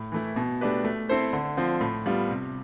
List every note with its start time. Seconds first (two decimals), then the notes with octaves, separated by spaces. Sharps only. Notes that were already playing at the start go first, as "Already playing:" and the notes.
Already playing: A2
0.12 E3 A3 E4
0.36 B2
0.61 A3 D4 G4 B4
0.84 A3
1.09 C4 E4 A4 C5
1.33 D3
1.57 F3 C4
1.81 A2
2.06 G3 B3 F4
2.30 C3